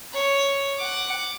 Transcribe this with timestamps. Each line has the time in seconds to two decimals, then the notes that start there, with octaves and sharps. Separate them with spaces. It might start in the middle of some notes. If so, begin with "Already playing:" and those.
0.14 C#5
0.78 F#5 D6